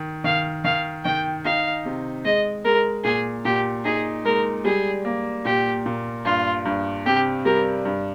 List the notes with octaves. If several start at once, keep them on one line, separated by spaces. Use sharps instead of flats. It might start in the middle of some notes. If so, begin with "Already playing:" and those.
Already playing: D#3
D#3 F5
D#3 F5
D#3 G5
D#4 F5
C3
G#3 D#5
G#3 A#4
A#2 G#4
A#2 G4
D#4 G#4
G#3 A#4
G3 G#4
A#3
A#2 G4
A#2
G2 F4
G2
C3 G4
G3 A#4
G2